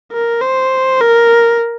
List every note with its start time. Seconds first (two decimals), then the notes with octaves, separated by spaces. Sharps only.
0.12 A#4
0.42 C5
1.01 A#4